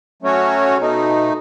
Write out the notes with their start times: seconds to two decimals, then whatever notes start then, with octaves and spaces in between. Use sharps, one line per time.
0.22 F#3 A3 C#4 F#4 C#5
0.78 B2 A3 D#4